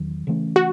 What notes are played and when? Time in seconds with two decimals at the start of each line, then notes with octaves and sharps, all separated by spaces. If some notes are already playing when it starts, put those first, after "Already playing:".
Already playing: E2 D#3 F#3
0.27 C#3 E3 A3 C#4
0.56 F#4